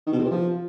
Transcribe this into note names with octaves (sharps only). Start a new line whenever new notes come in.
D#3
B2
E2
C3
F3